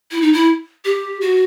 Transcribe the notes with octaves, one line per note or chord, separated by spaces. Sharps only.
E4
D#4
E4
G4
F#4